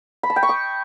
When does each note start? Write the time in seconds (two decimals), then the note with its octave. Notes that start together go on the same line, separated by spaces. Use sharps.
0.23 B5
0.30 A5
0.36 G5
0.43 C#6
0.49 D#6